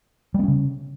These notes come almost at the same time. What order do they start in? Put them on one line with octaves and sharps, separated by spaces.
G3 B3 C#4 C#3